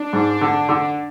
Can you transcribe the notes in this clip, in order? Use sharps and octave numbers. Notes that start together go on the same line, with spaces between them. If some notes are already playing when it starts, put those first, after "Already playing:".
Already playing: D4
G#2
D3
D3